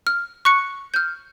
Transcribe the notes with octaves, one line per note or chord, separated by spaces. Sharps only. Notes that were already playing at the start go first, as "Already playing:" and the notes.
F6
C#6 F#6 C#7
F6 G6